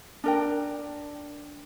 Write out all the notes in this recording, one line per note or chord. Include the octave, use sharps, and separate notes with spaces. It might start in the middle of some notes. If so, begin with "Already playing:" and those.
D4 A#4 G5